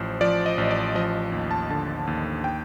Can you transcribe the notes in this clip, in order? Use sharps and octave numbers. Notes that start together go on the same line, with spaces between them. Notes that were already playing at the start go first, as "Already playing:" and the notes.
Already playing: A1 F3 C5
F3 D5
D#5
A1
D5
F3 D#5
D#2
A5
D3 A5
D#2
G5